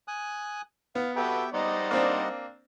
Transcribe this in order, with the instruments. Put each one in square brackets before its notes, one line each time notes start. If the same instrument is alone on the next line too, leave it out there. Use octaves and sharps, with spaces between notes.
[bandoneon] G#5 D#6 F#6
[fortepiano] B3 [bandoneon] F5
[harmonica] F#4 A4 B4 [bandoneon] G4 E5 G5
[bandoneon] G3 D#5 F#5 [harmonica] D#4 C5 D5
[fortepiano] A#3 C4 D4